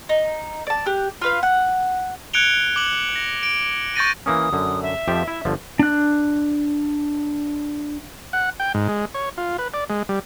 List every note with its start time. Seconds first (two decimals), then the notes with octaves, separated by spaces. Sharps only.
0.09 D#4
0.67 D5 A5
0.86 G4 F#6
1.21 F4 B4 F5
1.43 F#5
2.33 F#6 G#6 C#7 D7 F7 G7
2.76 D6 F#7
3.16 A#6
3.43 D7
3.96 C#6 G6 A6 A#6 D#7
4.26 E3 A#3 C#4 D#6
4.53 F#2 D3
4.82 E5
5.08 F2 F3 G4
5.28 E4
5.45 G1 D3 F3
5.79 D4 F#6
8.33 F#5
8.60 G5
8.74 G#2
8.88 G#3
9.14 C#5
9.37 F4
9.59 B4
9.74 D5
9.90 G#3
10.09 G3